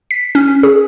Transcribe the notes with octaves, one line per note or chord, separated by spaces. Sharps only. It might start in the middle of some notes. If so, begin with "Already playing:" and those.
B6
C#4
G#4